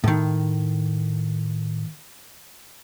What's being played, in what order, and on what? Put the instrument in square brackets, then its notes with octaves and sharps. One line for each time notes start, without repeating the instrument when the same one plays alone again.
[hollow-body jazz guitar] A2 D#3